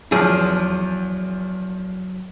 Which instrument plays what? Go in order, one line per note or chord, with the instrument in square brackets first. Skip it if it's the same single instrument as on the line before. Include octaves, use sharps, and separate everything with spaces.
[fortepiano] E2 F3 [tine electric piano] F#3 [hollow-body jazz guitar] G#4